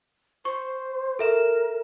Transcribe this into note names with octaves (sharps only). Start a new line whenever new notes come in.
C5 C#6
A4 A#4 E5 E7